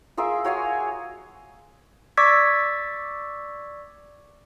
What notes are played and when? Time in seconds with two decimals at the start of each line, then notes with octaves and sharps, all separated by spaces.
0.17 F4 G#4 A#4 E5
0.44 F#4 C#5 F5 G#5
2.17 D5 C#6 D6 E6 G#6 B6